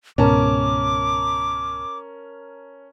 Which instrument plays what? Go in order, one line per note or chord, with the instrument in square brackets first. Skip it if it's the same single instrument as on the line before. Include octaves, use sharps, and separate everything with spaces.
[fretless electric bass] C#2 G#2 B2 [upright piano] C#4 A#4 A5 [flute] D6